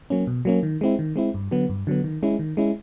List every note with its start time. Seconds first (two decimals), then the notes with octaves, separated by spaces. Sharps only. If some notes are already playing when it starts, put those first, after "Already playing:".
0.10 F#3 A#3 C#4
0.27 B2
0.45 F#3 A#3 C#4
0.63 D#3
0.81 G#3 C4 E4
0.99 D#3
1.16 G#3 C4 E4
1.34 G2
1.51 D3 F#3 B3
1.69 G2
1.87 D3 F#3 B3
2.04 D#3
2.23 G#3 C#4 E4
2.39 D#3
2.57 G#3 C#4 E4